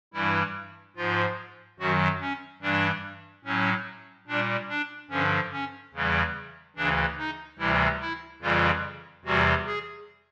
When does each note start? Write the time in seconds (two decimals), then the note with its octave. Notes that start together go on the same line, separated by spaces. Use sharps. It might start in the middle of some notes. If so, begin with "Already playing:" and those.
0.13 G2 E3 G3 E4
0.96 G#2 F3 F4
1.79 F#2 D#3 F#3 F#4
2.21 C#4
2.62 G2 E3 G3 D4
3.45 A2 F#3 C#4
4.27 A#2 G3 D4
4.69 D4
5.10 G2 D3 F3 C#4
5.52 C#4
5.94 E2 C#3 E3 G3
6.76 D2 C#3 E3 D4
7.18 D#4
7.59 D2 C3 E3 G3 E4
8.00 E4
8.42 F2 C#3 E3 G3 F4
9.25 E2 C3 E3 G3 F#4
9.66 G#4